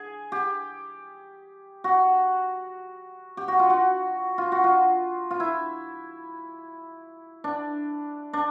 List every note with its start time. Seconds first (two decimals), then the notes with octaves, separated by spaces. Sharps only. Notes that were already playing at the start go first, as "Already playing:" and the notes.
Already playing: G#4
0.32 G4
1.84 F#4
3.37 G4
3.48 F#4
3.59 F4
3.70 F#4
4.38 F4
4.52 F#4
4.64 F4
5.31 F4
5.40 E4
7.44 D4
8.33 D4